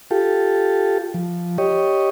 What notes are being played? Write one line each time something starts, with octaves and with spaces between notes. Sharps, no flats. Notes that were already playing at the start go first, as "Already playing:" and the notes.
F4 G4 A4
F3
G4 C#5 D#5